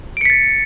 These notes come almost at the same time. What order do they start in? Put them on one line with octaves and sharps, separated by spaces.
D7 C#7 B6 A6